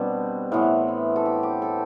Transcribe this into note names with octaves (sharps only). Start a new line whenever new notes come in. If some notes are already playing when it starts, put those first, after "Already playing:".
Already playing: B2 G3 B3 C4 D4
A2 E3 B3 C4
E4
A4
G4
G4
A4